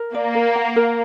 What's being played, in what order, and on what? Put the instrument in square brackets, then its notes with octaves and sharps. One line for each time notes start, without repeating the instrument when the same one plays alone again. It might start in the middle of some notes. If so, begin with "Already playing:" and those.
Already playing: [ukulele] A#4
[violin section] A#3 [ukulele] D5
[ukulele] A#4
F#5
A#4